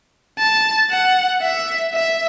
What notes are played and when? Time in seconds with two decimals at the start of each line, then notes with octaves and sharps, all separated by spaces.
0.39 A5
0.90 F#5
1.42 E5
1.94 E5